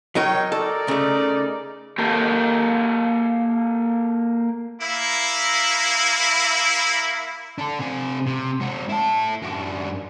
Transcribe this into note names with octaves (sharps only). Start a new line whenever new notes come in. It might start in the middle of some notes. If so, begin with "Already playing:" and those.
F#3 D#4 A#4 C#5 G5 C#6
D#4 A4 A#4 D5
C#3 A3
A#3 G4 A4
A#3 E4
D4 A4
C3 G#5
C3
G#3 F#4
E4 A5
F#2 D4